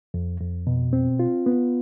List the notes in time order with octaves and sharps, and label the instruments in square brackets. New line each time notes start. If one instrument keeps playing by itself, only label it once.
[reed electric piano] F2
F2
B2
C4
F4
B3